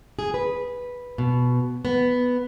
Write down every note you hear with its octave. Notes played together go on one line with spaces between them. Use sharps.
G#4
B4
B2
B3